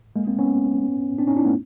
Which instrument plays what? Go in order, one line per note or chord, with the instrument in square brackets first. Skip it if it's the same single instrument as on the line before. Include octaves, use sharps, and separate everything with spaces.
[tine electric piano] G#3 A#3
A#3 C4
B3 C#4
C4 D4
C#4 D#4
D4 E4
A3 B3